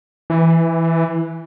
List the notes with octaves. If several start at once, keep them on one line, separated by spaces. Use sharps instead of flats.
E3